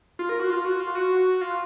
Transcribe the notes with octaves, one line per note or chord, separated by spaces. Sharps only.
F4
A#4
F#4
F4
F#4
F4
F#4
F4